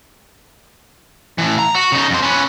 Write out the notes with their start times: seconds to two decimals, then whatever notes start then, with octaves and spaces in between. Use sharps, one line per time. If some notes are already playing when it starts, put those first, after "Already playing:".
1.38 A2 E3
1.59 A#5
1.75 F#4
1.92 C#3 D#4
2.10 F2 C5
2.22 C#4 B4